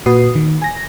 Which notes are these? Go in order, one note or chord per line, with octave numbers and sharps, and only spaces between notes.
A#2 F#4 B4 D#6 C7
D#3
G#5 A#6